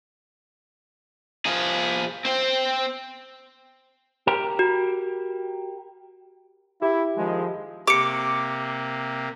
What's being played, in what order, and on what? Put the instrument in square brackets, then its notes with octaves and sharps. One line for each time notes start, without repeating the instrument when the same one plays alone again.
[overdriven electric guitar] F3 G#4
C4 C5
[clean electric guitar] G4 A#4
[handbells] F#4
[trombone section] E4 [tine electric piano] G4
[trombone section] D#3 F3 G#3
[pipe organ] C3 A#3 [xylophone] G4 C#7 [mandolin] D6